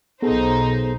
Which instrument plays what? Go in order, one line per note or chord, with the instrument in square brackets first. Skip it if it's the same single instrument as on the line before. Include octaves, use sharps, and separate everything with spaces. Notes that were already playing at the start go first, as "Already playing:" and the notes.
[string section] B1 D#4 C5 [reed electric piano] B3 G#4 A4